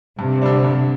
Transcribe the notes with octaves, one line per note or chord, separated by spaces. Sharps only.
G2 C3
D3 G3 D4
G2